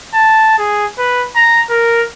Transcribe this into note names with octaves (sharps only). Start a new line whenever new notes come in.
A5
G#4
B4
A#5
A#4